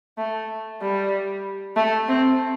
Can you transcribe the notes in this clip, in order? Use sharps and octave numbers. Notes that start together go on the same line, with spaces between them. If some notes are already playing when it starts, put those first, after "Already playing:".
A3
G3
A3
C4